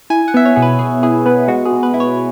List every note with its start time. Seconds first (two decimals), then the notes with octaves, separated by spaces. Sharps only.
0.10 E4 G#5
0.28 F#5
0.34 B3 E5
0.45 C#5
0.56 B2 G#4
0.62 B4
0.79 B2 G#4
1.03 E4 G#4
1.26 B3 B4
1.48 G#3 F#4
1.65 G#4
1.72 B2
1.83 B4
1.94 E4
2.00 C#5